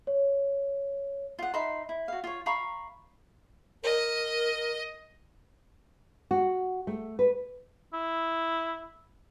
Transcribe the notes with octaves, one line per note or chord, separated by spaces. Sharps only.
C#5
F4 F#5
D#4 E5 B5 C6
E4
F#4 F5
F4 C#5
F5 A#5 B5 C#6
A#4 D#5
F#4
A3
B4
E4